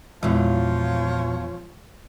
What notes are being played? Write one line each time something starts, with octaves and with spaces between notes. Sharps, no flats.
E2 A#2 F3 F#3 G#3 E4 F4 C#5